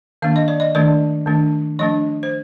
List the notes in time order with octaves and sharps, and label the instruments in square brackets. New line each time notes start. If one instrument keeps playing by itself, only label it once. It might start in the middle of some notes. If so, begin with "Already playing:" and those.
[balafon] D#3 A#3 D4 F5
D#5
D5
D#5
D#3 A3 D4 D5
D#3 A3 D4
F3 A3 D4 D#5
C5